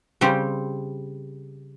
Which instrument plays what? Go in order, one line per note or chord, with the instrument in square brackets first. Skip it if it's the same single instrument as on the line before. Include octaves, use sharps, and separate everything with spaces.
[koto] C#3 G3 C4 G4